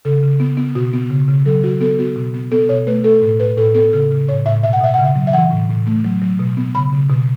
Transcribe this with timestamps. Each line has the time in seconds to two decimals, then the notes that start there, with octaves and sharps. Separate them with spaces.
0.05 C#3 A4
0.23 C#3
0.40 B3
0.57 B3
0.75 B2 F#4
0.93 B3
1.10 C#3
1.28 C#3
1.46 F#3 A4
1.63 F#3 F#4
1.81 B3 A4
1.99 B3 F#4
2.16 B2
2.34 B3
2.51 B3 A4
2.69 B2 C#5
2.87 A3 B4
3.04 A3 A4
3.22 A2 A4
3.40 A2 B4
3.57 A2 A4
3.74 B3 A4
3.93 C#3 A4
4.11 C#3
4.28 A2 C#5
4.46 A2 E5
4.63 B2 E5
4.73 F#5
4.81 B2 E5
4.94 C#3 F#5
5.04 E5
5.16 F#3
5.27 E5
5.33 E3 F#5
5.51 A2
5.70 A2
5.87 A3
6.04 F#3
6.22 F#3
6.39 B2
6.57 B3
6.75 C#3 B5
6.93 C#3
7.10 B2